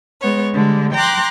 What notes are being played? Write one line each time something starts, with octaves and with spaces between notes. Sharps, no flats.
G#3 B3 C#5
D3 G3 G#3
G5 A#5 C6 D6 F#6